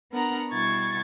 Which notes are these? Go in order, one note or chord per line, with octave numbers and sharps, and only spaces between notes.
B3 D4 A#4 F#5 A#5
B2 G3 E4 C#6 G#6 A6